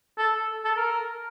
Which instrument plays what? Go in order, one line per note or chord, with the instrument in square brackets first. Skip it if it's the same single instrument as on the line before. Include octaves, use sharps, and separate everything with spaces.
[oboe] A4
A4
A#4